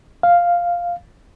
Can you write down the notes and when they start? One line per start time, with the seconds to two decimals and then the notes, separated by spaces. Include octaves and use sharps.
0.23 F5